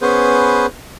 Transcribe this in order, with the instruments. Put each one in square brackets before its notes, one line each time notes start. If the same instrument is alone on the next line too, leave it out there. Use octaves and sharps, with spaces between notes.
[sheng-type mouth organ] B3 C#4 G#4 B4 C5